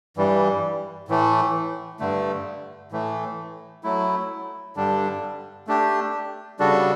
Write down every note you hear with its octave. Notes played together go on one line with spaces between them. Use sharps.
G2 E3 G3
A2 E3 A3
G2 D3 A3
A2 E3 A3
F#3 A3 E4
G2 D3 G3 D4
A3 D4 G4
C#3 G3 D4 F#4 A4